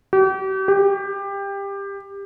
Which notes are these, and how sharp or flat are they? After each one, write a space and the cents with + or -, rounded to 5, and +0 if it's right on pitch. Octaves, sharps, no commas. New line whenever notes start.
G4 -40
G4 +20